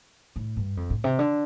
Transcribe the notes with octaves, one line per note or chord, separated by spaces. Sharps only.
A2
G2
F2
A2
C3
D3